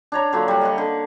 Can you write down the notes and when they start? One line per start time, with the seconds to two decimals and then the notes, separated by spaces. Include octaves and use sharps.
0.12 D4 C#5 A#5
0.33 D3 F#3 A#3 F4
0.48 G3 F#5
0.61 D#5 F#5 C#6
0.78 D3